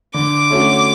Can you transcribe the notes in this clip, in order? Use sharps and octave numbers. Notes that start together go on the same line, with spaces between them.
D3 D6
A3 C#4 F#4